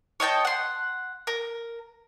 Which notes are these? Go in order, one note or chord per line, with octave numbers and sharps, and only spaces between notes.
C#5 D#5 G5 A5
F#5 C6
A#4